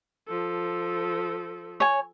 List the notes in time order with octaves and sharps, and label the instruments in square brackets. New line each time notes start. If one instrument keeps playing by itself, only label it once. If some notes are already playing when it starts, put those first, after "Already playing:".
[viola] F3 A4
[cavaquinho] C#5 G#5